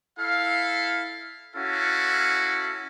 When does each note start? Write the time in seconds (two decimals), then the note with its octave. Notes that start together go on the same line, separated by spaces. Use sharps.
0.19 E4 A4 F5
1.56 C#4 E4 F#4 A4 F5